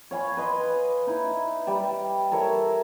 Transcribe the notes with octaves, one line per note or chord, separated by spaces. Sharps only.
C#5 F5 G#5 B5
B4 D#5 C6
D#4 E4
G3 D5
A4 A#4 C#5 E5